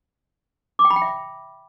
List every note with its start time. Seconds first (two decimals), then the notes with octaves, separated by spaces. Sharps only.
0.79 D6
0.85 G5
0.90 B5
0.96 G5
1.02 E5